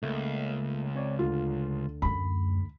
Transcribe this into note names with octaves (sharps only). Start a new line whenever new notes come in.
C#2 A3 A#3
C4 C#5 D5
D2 D3 F4
F#2 A3 B5